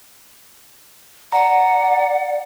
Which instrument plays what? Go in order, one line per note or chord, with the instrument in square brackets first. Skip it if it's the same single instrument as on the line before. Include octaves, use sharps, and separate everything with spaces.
[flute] D5 [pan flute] F#5 [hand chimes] A#5